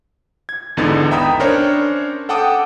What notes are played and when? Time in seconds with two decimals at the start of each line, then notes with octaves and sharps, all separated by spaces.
0.49 G#6
0.77 G#1 E2 D3 B3 D#4 A6
1.11 E5 G5 A#5 B5 D#6
1.40 C#4 D4 A#4 C5 C#5
2.29 A4 F#5 G5 A5 D6 D#6